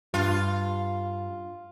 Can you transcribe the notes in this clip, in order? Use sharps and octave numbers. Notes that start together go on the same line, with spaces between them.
G2 F4